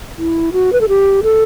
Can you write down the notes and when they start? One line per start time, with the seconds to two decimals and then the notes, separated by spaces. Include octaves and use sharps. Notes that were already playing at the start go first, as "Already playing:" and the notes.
0.18 E4
0.53 F#4
0.73 B4
0.81 A4
0.89 G4
1.24 A4